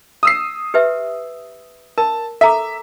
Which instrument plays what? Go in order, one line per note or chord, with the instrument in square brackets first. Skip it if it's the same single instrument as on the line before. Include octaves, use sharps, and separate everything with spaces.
[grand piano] D#6 E6 C7
[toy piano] G4 B4 E5
[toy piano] A#4 [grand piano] A5
[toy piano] A4 A#5 D6 [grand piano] E5